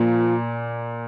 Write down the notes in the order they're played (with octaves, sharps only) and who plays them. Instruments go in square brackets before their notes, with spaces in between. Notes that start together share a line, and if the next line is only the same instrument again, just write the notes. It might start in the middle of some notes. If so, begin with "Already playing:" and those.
Already playing: [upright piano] A#2 [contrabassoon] F3